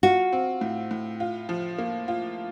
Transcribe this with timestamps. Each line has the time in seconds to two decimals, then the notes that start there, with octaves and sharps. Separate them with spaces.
0.03 F4 F#4
0.32 C4
0.61 A2
0.91 A2
1.20 F4
1.49 F3
1.78 A#3
2.08 F4